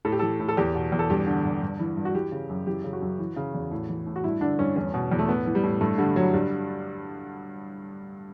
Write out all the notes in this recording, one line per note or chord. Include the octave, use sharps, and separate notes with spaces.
A2 A4
G4
E3 A4
A2
A4
E2 G4
B2
E2
A4
G2 G4
D3
G2
G2
E3
G2
F#4
E3 G4
C#3
F#2
E3 G4
C#3
F#4
F#2
E3
C#3
E2
A2
E3
A2
F#4
G2 E4
D3 D4
G2 C#4
E2 C#4
B2
E2
A3
A2 B3
E3
G3
A2
G2 A3
D3 G3
G2 F#3
G2 G3